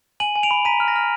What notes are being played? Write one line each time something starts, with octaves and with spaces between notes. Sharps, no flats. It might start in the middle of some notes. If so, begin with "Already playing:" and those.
G#5 D#7 F#7
G#5
D7 F7
B5
A#5 B6 D#7
F6
A#6
F6